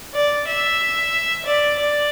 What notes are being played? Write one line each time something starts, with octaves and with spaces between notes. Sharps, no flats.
D5
E5
D5
D5